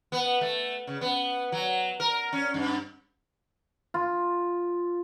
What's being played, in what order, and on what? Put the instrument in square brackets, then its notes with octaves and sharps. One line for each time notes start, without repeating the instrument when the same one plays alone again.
[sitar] B3
A3
C#3
B3
F#3
A#4
C#4
G2
[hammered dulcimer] F4